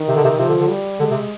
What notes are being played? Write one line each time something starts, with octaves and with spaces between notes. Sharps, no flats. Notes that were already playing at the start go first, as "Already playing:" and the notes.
Already playing: D#3
C3
D3
C3
C3 F3
D3
D3
G3
D3 G#3
C3